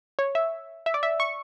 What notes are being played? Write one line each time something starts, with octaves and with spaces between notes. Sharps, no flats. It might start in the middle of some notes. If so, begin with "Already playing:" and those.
C#5
E5
E5
D5
E5
C#6